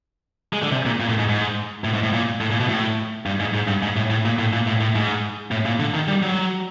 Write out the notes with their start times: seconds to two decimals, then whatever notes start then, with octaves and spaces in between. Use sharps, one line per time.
0.53 G#3
0.63 D3
0.71 C3
0.86 A#2
1.00 A#2
1.09 A2
1.18 G#2
1.29 G#2
1.84 A2
1.94 G#2
2.03 A2
2.13 A#2
2.41 A2
2.51 A#2
2.60 B2
2.69 A2
3.26 G2
3.40 G#2
3.54 G#2
3.68 G2
3.83 G#2
3.97 A2
4.10 A2
4.25 A#2
4.39 A2
4.53 A#2
4.67 A2
4.81 A2
4.95 G#2
5.51 A2
5.65 A#2
5.80 D3
5.94 D#3
6.08 G3
6.23 F#3